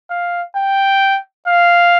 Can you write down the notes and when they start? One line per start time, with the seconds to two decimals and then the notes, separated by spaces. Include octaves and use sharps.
0.10 F5
0.55 G5
1.47 F5